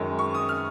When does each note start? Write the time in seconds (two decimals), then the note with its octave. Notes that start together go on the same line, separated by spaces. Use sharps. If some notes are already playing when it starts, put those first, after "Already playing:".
Already playing: F#2 D#3 G#3
0.19 C#6
0.34 D#6
0.49 F6